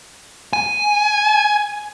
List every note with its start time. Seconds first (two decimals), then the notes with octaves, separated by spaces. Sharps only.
0.53 G#5